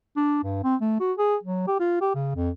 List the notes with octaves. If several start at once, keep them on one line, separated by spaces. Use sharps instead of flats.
D4
G2
C4
A3
F#4
G#4
F#3
G4
F4
G4
C#3
F2